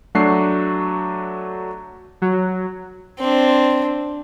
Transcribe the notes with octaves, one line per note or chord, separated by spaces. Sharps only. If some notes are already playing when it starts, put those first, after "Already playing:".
F#3 A3 D4 F#4 C7
F#3
C4 D4